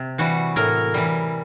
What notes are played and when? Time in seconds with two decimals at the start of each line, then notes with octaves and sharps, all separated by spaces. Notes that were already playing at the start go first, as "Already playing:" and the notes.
Already playing: C3
0.18 E3 G3 F#4
0.56 A2 A#4
0.94 E3 G3